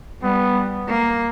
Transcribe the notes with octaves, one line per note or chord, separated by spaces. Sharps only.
G3 B3
A#3